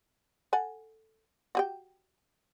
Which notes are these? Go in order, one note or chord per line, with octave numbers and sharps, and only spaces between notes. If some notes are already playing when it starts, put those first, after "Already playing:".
A4 F#5 G#5
F#4 G4 G5